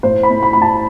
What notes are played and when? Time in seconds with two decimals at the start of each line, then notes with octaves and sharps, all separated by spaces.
0.03 A2 C5
0.23 B5
0.30 A3
0.43 B5
0.53 A3 B5
0.62 A5